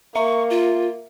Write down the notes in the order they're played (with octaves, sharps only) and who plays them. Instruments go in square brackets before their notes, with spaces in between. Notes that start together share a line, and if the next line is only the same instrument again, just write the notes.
[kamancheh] A#3 [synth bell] E5 [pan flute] C#6
[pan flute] F4